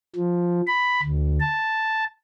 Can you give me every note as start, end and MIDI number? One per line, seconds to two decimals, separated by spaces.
0.16 0.61 53
0.67 1.01 83
1.03 1.39 38
1.40 2.04 81